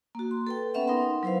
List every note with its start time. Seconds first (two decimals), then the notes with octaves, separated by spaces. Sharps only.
0.15 A#3 F#4
0.31 C6
0.47 A4 B4 G5
0.74 B3 C#4 B4 E5 F#5
0.87 D#4 A#4 F#5 B5 C6
1.23 F#3 E4 B4 C5 F5